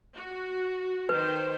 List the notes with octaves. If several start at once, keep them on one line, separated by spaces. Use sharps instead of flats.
F#4
D#3 B4 C5 G5